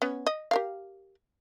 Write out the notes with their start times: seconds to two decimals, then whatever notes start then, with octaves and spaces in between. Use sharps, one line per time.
0.02 B3 C#4
0.26 D#5
0.51 G4 A#4 F5